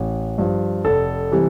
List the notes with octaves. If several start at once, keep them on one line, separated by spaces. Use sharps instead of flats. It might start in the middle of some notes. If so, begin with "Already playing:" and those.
Already playing: A1
G2 F3
F1 A4
C3 E3 G3